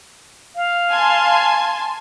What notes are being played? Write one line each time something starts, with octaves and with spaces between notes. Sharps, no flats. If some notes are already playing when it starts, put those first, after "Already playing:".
F5
G#5 A5 C6